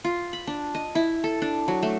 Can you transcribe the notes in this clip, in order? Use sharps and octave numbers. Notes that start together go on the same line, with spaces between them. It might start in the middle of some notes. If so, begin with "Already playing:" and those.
F4
B5
D4
D#5
E4
A4
D4
F#3
A3